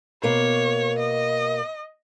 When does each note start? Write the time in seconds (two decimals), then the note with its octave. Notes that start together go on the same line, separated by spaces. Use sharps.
0.23 B2 A#3 C#5
0.99 D#5